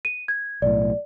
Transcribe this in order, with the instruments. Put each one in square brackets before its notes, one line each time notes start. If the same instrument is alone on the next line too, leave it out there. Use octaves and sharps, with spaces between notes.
[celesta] D#7
G#6
[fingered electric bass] B1 A2 [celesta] D5